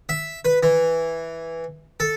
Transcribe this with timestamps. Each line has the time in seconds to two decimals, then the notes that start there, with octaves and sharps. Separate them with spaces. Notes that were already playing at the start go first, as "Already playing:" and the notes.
0.09 E5
0.45 B4
0.63 E3
2.00 A4